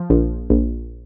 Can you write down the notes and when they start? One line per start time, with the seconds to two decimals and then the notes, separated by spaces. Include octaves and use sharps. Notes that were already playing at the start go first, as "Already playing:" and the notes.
Already playing: F3
0.10 A#1
0.50 A#1